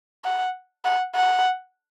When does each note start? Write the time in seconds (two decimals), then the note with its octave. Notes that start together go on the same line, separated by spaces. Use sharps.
0.24 F#5
0.85 F#5
1.15 F#5